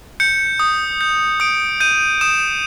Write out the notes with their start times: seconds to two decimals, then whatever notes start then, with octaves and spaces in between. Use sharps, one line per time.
0.20 G6 C#7
0.60 D#6
1.01 G6
1.40 D#6 D7
1.80 G6 D#7
2.21 D#6 E7